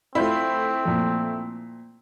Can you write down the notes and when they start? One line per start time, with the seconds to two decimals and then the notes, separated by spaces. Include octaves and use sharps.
0.15 A3 C4 E4 F4 C5 E5
0.85 A#2 F3